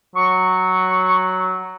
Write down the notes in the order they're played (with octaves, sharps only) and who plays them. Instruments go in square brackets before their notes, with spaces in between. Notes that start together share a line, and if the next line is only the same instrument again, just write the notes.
[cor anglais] F#3 [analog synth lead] C#6